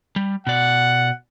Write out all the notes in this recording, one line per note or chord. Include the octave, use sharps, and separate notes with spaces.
G3
B2 D5 F#5